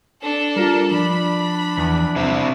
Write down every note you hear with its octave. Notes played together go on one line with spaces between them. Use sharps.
D4 A4
G3 F4 A#4
F3 D4 B5
E2
C3 C4 E4